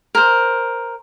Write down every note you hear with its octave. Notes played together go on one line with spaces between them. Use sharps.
A#4 C5